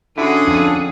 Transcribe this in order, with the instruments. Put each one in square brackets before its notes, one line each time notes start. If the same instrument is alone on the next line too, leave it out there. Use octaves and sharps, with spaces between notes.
[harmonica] D3 [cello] C#4 G#4 [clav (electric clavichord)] E4 F#4
[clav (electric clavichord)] F2